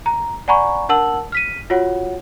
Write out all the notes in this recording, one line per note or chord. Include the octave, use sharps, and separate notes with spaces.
A#5
D5 F#5 G#5 A#5 B5 C#6
D4 A#4 F#5 A5 E6 F#7
F6 B6 D#7
F4 F#4 C#5 F#5